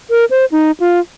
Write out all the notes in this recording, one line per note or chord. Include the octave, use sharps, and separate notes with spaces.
A#4
C5
D#4
F4